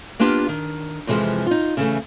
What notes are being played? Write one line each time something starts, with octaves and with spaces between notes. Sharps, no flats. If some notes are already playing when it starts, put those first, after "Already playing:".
A#3 B3 D4 F4 G4
D#3
F2 C3 E3 F3 G#3
D#4 F4
C#3 E3 A3